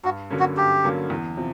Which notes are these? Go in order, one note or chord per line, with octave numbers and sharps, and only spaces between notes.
G2 F#4
D3 F#3 A#3 C#4
F#4
G2 G4
D3 F#3 A#3 C#4
E2
C3 F3